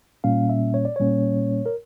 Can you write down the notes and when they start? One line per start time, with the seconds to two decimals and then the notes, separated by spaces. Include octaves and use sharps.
0.24 A#2 G3 A#3 C#4 F5
0.49 E5
0.74 C#5
0.85 D5
0.96 A#2 G3 A#3 C#4 C#5
1.66 A#4